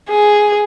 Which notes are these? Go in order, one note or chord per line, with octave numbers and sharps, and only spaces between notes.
G#4